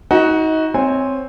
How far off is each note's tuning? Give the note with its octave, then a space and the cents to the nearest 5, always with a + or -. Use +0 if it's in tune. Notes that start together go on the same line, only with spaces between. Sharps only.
D#4 +30 F#4 +0
C4 +0 C#5 +0 G#5 -25